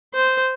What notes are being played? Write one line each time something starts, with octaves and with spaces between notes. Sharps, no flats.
C5